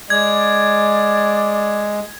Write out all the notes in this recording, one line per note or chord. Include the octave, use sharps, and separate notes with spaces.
G#3 D5 G#6